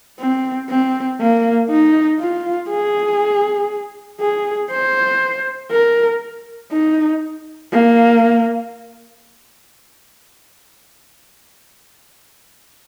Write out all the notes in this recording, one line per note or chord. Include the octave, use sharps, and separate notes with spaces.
C4
C4
A#3
D#4
F4
G#4
G#4
C5
A#4
D#4
A#3